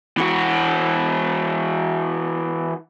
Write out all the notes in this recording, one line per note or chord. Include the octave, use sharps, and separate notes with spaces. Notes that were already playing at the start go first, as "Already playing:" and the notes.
E3 F#4